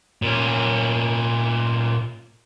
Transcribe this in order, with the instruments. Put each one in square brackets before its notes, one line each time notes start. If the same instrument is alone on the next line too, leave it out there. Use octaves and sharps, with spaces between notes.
[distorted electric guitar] A#2 C#4